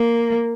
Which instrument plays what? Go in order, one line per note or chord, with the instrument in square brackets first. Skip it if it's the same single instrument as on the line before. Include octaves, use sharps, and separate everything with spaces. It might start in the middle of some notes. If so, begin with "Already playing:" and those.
Already playing: [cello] A#3